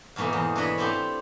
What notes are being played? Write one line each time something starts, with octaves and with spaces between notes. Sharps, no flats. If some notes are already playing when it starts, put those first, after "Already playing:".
E2 G#2 B2 A3 A#3
E2 D#5
E3 D4 C#5 D#5 B5
C4 E4 F4 G4 A4